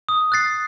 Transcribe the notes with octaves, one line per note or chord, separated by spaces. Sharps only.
D#6
F#6 A6 C7